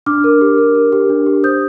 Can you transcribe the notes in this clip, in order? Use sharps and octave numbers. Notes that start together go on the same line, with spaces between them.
D4 D6 F6
A#4
G4
A#4
A#4
G4
D4
G4
C5 D#6 G6